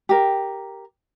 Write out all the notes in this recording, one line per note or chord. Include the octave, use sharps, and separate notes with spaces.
G4 A#4